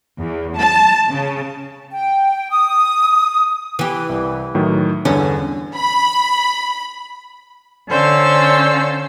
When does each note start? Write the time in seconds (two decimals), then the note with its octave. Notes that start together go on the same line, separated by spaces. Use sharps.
0.19 E2
0.57 A5
1.10 C#3
1.91 G5
2.51 D#6
3.79 E3 G4
4.09 C2
4.55 A2 D#3 F#3
5.05 E2 G2 D3 C#4
5.75 B5
7.89 D3 C#4 C5 F5 E6